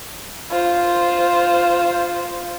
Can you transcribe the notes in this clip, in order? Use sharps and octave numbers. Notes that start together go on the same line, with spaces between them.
F4 C5